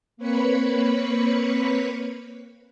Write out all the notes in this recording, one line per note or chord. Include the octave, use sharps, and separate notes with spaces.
A#3 C4 B4 C#5 B5 C#7